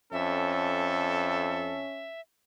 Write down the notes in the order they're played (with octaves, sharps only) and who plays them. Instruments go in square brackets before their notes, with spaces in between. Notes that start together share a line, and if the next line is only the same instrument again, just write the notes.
[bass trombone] F2 [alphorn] C#4 [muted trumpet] A4 [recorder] E5